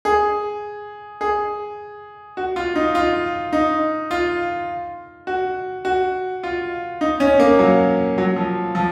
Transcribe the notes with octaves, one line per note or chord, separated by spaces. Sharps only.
G#4
G#4
F#4
F4
D#4
F4
D#4
F4
F#4
F#4
F4
D#4
C#4
A#3
F#3
F#3
F3
F3